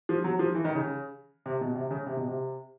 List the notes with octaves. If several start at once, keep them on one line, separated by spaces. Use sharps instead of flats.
F3
F#3
F3
E3
D#3
C#3
C3
B2
C3
C#3
C3
B2
C3